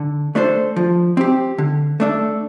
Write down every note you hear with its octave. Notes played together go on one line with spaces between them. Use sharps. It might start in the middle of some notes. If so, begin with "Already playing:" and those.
Already playing: D3
A3 D4 A4 C5
F3
C4 G4
D3
A3 D4 A4